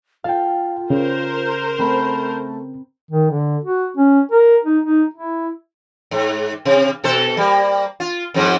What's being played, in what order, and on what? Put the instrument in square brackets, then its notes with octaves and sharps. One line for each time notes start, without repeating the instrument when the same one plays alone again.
[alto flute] F4 [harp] A4 G5 [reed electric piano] F5
[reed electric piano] C#3 [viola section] A#4 C5
[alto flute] A3 [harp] C4 B5
[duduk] D#3
D3
F#4
C#4
A#4
D#4
D#4
E4
[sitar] G#2
C3
B2 A4 C5
G3 A#3
F4
F2 G#2 G#3